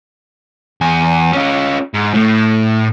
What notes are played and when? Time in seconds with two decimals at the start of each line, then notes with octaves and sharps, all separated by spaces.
0.81 E2 G#5
1.33 C#4 F4
1.94 G#2
2.14 A2 A3